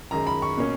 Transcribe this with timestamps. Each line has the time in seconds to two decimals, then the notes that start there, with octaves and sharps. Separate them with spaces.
0.11 F#2 D#3 G#3 A#5
0.27 B5
0.42 C#6
0.57 B2 A#3 C#4